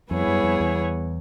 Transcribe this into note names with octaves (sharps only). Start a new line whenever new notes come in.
F2 G3 B3 E4 G#4 C#5
F#2
F2
E2